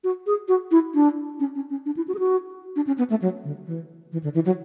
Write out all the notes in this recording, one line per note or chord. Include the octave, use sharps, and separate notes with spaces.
F#4
G#4
F#4
E4
D4
C#4
C#4
C#4
D4
E4
F#4
G#4
F#4
D4
C#4
B3
A3
F#3
D3
E3
E3
D3
E3
F#3